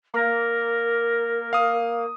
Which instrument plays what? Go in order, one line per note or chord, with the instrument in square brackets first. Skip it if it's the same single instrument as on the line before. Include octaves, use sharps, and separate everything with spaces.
[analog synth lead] A#3 [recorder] A#4
[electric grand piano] F5 D#6